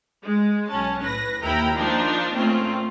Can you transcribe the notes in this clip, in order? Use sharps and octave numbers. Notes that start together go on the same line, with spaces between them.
G#3
B1 C#4 A5
A2 B4 A#6
D#2 E4 A#4 G5 A#5 B5
F3 A#3 D4 D#4 F4
A#2 A3 C4 C#4 F4